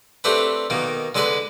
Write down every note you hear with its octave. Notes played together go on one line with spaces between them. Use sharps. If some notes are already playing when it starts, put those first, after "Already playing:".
A3 C4 D4 G4 A4 B4
B2 D#3 A#3
D3 G#3 A4 B4 D5